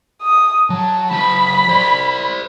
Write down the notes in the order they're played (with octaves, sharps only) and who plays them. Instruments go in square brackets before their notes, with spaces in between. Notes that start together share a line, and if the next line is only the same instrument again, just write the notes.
[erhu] D#6
[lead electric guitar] F#3 [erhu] A5
[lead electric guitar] F#3 A5 [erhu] B5
[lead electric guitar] C5 D5